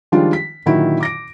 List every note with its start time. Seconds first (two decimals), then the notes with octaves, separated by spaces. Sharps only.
0.12 D#3 F3 G3 G#3 D4 F4
0.33 B6
0.66 A#2 D3 D#3 F#3 E4 F#4
1.00 D6 A#6 D7